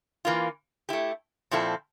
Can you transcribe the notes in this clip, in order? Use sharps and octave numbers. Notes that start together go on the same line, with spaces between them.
E3 A#3 F4
A3 E4 G4
A#2 F3 C4 E4 A4